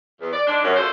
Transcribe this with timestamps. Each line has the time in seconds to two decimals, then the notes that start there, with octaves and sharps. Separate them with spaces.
0.21 E2
0.33 D5
0.47 G#2 D4
0.63 F#2
0.76 D3 A3 F4 A4 C5